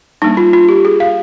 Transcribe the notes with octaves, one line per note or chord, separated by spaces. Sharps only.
G3 A#3 D4 D#4
F4
F4
G4
G#4
F5